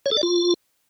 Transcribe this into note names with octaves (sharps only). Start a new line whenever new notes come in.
C#5
A4
D5
F4